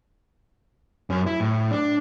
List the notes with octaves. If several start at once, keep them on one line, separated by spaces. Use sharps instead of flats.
F#2 C#4
E4
A2
D4